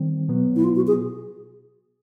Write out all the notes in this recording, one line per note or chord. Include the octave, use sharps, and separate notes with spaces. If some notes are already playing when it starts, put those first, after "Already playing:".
Already playing: D#3 G3 C4
B2 F#3 B3
E4
F4
F#4
G#4